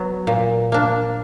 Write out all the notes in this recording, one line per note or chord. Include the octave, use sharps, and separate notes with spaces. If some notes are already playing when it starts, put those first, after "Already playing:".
Already playing: F#3 B3
A#2
A#3 D4